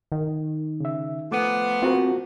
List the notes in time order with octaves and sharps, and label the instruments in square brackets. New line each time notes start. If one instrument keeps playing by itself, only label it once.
[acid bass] D#3
[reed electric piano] C#3 E5
[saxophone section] F3 B3 [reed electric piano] A3 D6
[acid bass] C4 [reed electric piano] F4 F#4 A#4